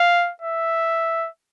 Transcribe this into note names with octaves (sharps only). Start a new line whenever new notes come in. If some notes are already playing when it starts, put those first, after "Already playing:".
Already playing: F5
E5